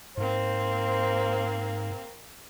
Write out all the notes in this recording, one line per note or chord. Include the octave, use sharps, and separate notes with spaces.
G#2 A#3 C4 C5